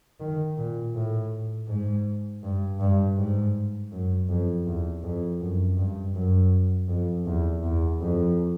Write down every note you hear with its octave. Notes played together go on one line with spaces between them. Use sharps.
D#3
A#2
A2
G#2
G2
G2
G#2
F#2
F2
E2
F2
F#2
G2
F#2
F2
E2
E2
F2